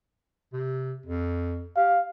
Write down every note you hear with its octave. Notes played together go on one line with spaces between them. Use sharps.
C3
F2
G4 F5